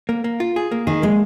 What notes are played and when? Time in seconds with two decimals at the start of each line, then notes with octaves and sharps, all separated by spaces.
0.09 A#3
0.24 A#3
0.40 F4
0.56 G#4
0.71 A#3
0.87 D#3 G#4
1.02 G#3 A#3